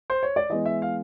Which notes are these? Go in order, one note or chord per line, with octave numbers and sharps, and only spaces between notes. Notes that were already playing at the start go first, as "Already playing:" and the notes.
C5
C#5
D5
E3 G#3 B3 D#5
E5
F5